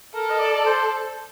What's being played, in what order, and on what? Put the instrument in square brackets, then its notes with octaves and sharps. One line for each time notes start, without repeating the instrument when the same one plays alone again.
[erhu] A4 [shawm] A#4
[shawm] D#5
D5
C5